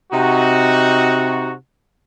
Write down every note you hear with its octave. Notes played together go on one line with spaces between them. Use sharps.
C3 D#4 F#4